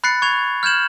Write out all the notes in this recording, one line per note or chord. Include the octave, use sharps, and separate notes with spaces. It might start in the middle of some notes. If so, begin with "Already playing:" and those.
B5 F#6 A6 C7 C#7
C#6 G#6 F7
F6 G6 G#6 E7 F#7